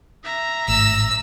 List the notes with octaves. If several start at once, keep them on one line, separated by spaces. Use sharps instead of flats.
E5 A#5
G#1 A2 E6